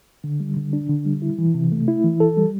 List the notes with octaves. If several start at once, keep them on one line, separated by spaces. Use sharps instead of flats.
D3
G3
D3
D4
D3
G3
E4
E3
C3
A3
E4
E3
A4
G3